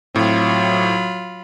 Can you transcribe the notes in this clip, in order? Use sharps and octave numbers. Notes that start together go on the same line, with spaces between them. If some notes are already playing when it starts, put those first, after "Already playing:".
A2 F#3 C4 F4 B5